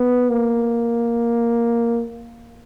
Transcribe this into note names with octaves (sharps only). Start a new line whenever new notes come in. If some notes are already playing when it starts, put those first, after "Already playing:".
Already playing: B3
A#3